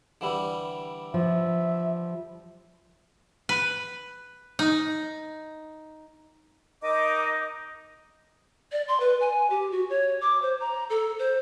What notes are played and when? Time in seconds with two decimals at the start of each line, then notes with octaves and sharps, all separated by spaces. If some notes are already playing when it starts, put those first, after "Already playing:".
0.21 D3 E3 G3
1.14 F3 E5
3.49 B4
4.59 D#4
6.83 D#4 A#4 D#5 D6
8.72 D5
8.88 C6
9.00 B4
9.21 G#5
9.50 G4
9.71 F#4
9.90 C#5
10.21 D6
10.42 C5
10.60 A#5
10.90 A4
11.19 C5